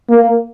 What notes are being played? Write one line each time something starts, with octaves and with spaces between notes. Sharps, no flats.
A#3